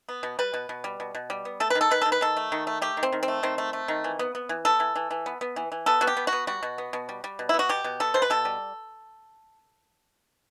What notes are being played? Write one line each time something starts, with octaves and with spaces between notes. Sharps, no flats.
B3
B2
G3 B4
B2
B2
G3
B2
B2
G3
B3
A3 A4
D#3 B4
A4
D#3 B4
D#3 A4
B4
D#3 A4
A3
D#3
A3
A3 G4
D#3
C4
D#3
C4
A3
D#3 C4
A3
A3
D#3
E3
B3
B3
E3
B3 A4
E3
E3
E3
B3
B3
E3
E3
B3 A4
B3 F#4
G4
B3
F#4
B3
G3 F#4
B2
B3
B2
G3
G3
B2
E4
B3
F#4
B2 G4
B2
B3 A4
B2 C5
B4
B2 A4
G3